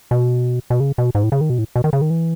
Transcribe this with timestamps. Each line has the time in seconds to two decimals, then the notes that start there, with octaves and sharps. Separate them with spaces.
0.11 B2
0.70 B2
0.80 C#3
0.98 B2
1.15 G#2
1.23 A2
1.32 C#3
1.41 D#3
1.50 B2
1.58 A2
1.76 B2
1.84 D#3
1.93 C#3
2.01 D#3
2.10 E3